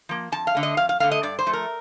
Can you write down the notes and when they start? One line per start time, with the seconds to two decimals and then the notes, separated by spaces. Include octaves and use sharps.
0.09 F3 A#3
0.32 F2 A5
0.47 F5
0.55 D3 A3
0.63 D#5
0.77 F2 F5
0.89 F5
1.00 D3 A3 F5
1.11 D#5
1.23 G2 D5
1.39 C5
1.46 F3 A3
1.53 A#4